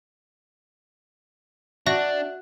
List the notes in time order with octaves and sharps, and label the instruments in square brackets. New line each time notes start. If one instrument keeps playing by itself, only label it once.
[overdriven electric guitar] D4 [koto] F#4 [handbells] E5